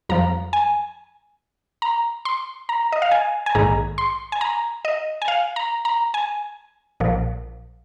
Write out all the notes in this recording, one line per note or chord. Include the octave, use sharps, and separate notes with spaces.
F2 F3 A#5
G#5
A#5
C6
A#5
D#5
F5
G#5
G#5
A#1 G#2 D#3 A#5
C6
G#5
A#5
D#5
G#5
F5
A#5
A#5
G#5
A#1 A#2 F3